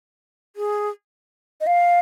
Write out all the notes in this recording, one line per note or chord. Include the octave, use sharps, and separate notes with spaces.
G#4
D#5
F5